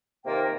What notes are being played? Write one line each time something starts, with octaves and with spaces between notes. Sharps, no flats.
C3 D#3 A#3 F4 G5